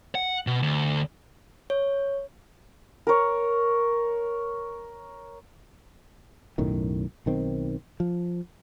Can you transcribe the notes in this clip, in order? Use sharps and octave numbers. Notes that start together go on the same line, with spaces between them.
F#5
B2
D2
C#5
A#4 C#5
B1 F#2 A2 D#3
B1 D#3 C4
F3